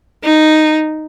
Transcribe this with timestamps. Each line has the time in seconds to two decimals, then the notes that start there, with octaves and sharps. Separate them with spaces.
0.24 D#4